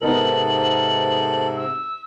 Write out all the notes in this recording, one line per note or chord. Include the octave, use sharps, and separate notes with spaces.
G#2 C3 B3 D#4 A4 A#4 F#7
E6